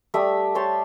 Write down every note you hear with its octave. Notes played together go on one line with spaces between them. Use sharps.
G3 A3 E5 D#6
C5 C#5 A5 C6